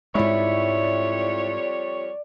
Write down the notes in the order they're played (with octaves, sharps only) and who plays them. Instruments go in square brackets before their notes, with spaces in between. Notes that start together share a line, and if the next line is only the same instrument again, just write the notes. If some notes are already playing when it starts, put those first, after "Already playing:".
[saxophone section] F2 G3 C#5 [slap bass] G#2 G#3 [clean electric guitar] E4 [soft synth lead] D5